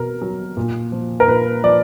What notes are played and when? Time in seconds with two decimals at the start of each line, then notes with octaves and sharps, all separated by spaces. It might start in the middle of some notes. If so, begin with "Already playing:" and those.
Already playing: B2 A#4
0.21 F#3
0.57 A#2
0.92 F3
1.20 A#4
1.28 A#2 B4
1.64 F3 D5